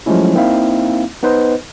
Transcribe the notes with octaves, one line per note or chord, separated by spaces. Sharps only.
F3 F#3 G#3 A3 C#4 E4
A#3 C4 D#4 E4 E5 F5
B3 D#4 B4 C5 D#5